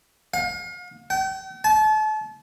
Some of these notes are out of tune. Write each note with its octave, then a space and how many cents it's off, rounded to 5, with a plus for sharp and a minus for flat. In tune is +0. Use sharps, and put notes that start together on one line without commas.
F5 +40
G5 -40
A5 -35